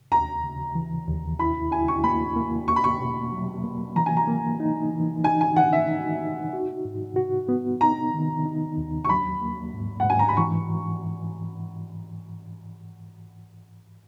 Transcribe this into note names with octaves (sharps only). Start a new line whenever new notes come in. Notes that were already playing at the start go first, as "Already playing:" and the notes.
D#2 A#5
C#3
E3
D#2
E4 B5
E4 G#5
C#6
A#3 B5
A#3
E2 C#6
B5
C#6
B2
F#3
A#3
E3 A#5
G#5
A#5
A#3
D#4
E3
D#4 G#5
G#5
D#3 F#5
E5
D#4
D#4
F#4
G#2
F#4
B3
D#4 A#5
D#3
D#4
D#2
C#6
F#3 B5
A#3
G#2
F#5
G#2 G#5
A#5
B5
E3 C#6